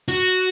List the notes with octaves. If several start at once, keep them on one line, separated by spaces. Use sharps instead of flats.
F#4